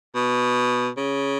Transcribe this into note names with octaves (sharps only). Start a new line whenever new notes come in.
B2
C#3